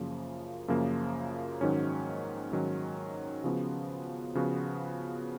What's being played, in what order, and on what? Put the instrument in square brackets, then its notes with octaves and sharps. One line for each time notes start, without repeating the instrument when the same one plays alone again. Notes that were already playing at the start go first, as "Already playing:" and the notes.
Already playing: [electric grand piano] F#2 C#3 F3 A#3
F#2 C#3 F3 A#3
G#2 D#3 F#3 C#4
G#2 D#3 F#3 C#4
C#3 F3 B3 F#4
C#3 F3 B3 F#4